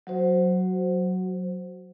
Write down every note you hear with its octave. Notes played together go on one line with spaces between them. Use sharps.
F#3 F#4 C5